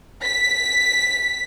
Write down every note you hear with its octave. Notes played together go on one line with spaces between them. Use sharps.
B6